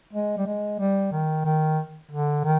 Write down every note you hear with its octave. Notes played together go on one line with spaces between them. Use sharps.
G#3
G3
G#3
G3
D#3
D#3
D3
D#3